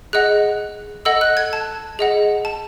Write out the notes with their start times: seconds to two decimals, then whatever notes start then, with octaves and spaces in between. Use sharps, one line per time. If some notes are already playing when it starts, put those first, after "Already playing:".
0.13 G#4 D#5 F#5 F#6
1.05 A4 D#5 F#5 E6
1.21 F#6
1.37 G#6
1.53 A5
1.99 G#4 D#5 F#5
2.45 A5